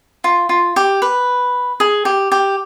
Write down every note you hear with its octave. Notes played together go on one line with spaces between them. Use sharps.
F4
F4
G4
B4
G#4
G4
G4